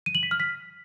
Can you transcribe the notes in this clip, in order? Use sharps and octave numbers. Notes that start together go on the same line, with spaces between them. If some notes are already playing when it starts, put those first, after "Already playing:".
D#7
F#7
B6
F6
B6